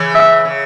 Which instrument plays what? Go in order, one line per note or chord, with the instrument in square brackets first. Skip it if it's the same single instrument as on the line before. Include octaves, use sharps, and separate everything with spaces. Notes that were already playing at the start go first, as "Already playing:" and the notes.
Already playing: [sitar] C#3 E3
[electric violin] E5
[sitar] C#3